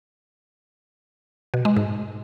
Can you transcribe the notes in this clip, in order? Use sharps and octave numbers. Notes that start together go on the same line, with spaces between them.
B2
G#3
G#2